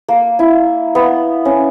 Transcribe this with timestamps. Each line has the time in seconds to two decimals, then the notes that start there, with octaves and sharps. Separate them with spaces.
0.08 A#3
0.39 E4
0.95 B3
1.45 C#4